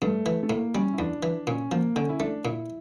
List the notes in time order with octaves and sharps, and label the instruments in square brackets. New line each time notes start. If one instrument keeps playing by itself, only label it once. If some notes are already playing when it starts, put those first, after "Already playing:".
[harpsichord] G2 [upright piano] A3
[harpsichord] E3
[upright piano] A3
[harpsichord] A2 [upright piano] A#3
[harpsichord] G3 [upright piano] C#4
[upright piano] E4
[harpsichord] E2 [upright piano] D4
[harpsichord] E3
[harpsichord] A#2 [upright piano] C#4
[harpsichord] F3 [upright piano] A#3
[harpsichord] D3 [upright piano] C#4
[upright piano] E4
[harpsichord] A3 [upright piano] D4
[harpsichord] A#2 [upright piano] E4